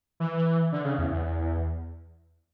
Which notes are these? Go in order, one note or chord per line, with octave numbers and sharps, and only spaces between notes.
E3
D3
C#3
E2
E2